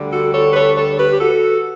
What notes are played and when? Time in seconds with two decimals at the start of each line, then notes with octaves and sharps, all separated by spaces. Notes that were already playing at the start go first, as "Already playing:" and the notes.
Already playing: D2 D3 G3
0.13 F#4 A4
0.34 A4 C#5
0.51 B4
0.55 A4 C#5
0.77 A4 C#5
0.98 G4 B4
1.11 G4
1.19 F#4 A4